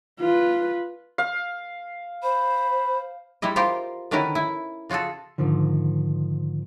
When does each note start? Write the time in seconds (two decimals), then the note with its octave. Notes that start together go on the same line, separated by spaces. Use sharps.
0.20 F4 B4
1.18 F5
2.23 C5 B5
3.42 G3 G#3 E4 D#5
3.56 F4 G4 A#4 C5
4.11 D3 D#3 C#4 E4 A#4 B4
4.35 E4
4.89 C#3 F4 F#4 G#4 A4
5.38 G#2 D3 D#3 F3